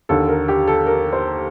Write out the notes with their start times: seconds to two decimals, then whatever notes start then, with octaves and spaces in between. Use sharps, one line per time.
0.09 D#2 D3 A4
0.29 A#4
0.48 G4
0.68 A4
0.87 A#4
1.13 C5